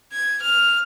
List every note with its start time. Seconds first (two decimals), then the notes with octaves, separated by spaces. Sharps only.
0.12 G#6
0.42 F6